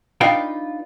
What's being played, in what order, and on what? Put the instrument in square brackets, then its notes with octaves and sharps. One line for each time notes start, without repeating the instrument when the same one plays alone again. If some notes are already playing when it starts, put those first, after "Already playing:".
[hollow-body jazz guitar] D4 D#4 F4 B4 F5 G5